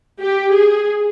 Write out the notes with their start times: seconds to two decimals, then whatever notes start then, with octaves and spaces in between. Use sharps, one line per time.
0.20 G4
0.52 G#4